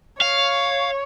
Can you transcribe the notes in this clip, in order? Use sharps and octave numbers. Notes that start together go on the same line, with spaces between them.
C#5 F5